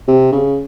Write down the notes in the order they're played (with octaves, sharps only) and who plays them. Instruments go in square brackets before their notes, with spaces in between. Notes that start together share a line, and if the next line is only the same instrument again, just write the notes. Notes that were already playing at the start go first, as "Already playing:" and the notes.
[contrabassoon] C3
C#3